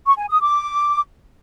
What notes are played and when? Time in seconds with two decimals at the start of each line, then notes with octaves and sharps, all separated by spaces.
0.07 C#6
0.18 G#5
0.30 D#6
0.41 D6